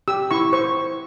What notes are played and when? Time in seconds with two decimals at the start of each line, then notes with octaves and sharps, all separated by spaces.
0.08 G4 E6
0.31 E4 C#6
0.53 C5 C#6